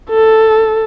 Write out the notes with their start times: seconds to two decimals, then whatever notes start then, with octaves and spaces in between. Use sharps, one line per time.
0.10 A4